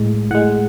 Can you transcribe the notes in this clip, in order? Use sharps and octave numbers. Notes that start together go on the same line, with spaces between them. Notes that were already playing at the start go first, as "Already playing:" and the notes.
Already playing: A2 G#3
A2 G#3 F#5